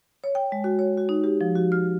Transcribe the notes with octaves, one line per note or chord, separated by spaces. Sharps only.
C#5
G5
G#3
F#4
C#5
F#4
D#4
G4
F3
F#4
F6